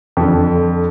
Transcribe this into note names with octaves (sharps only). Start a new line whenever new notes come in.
F2 D3